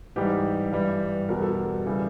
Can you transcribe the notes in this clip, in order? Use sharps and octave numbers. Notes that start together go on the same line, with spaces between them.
G#2 E3 G3 G4
G2 E3 G3
E2 B2 G3 A#4
A4
A#4
C#3 E3 G3